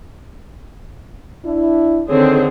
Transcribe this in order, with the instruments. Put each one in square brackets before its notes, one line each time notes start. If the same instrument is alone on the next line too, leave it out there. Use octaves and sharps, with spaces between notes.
[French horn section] D4 E4
[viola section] D3 C4 G#4 [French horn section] D#3 C#5